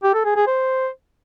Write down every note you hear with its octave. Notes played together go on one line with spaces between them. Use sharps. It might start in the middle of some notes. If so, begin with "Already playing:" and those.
G4
A4
G#4
G#4
C5